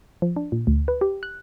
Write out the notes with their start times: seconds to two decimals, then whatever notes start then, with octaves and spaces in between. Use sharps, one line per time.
0.22 F3
0.36 D4
0.52 A#2
0.67 D2
0.88 B4
1.01 G4
1.23 F#6